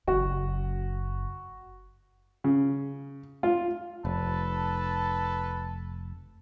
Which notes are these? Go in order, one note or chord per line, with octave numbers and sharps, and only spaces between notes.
F#1 F#2 F#4
C#3
F4
F1 A4 B4 A5